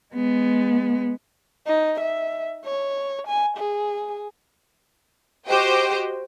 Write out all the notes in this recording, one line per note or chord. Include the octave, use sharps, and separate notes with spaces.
G#3 B3
D#4
E5
C#5
G#5
G#4
F#4 G4 C5 D#5 G5